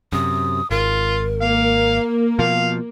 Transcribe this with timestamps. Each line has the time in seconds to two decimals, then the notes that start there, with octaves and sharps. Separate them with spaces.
0.12 F#2 C3 D#6
0.71 G#1 F4 A#4
1.41 A#3 F5
2.39 B2 F3 F5